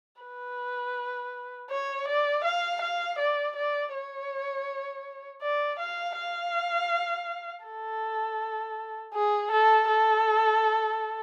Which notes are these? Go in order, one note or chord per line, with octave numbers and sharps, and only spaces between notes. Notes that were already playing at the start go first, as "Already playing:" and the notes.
B4
C#5
D5
F5
F5
D5
D5
C#5
D5
F5
F5
A4
G#4
A4
A4